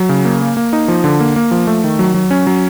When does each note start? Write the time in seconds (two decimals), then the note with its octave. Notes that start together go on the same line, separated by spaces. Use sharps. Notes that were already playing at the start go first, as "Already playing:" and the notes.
Already playing: F#3
0.09 C#3
0.25 A#3
0.41 A#3
0.57 A#3
0.73 D#4
0.88 F3
1.04 D3
1.20 A#3
1.36 A#3
1.51 F3
1.67 A3
1.84 D#3
1.99 F#3
2.14 F#3
2.31 C#4
2.47 F#3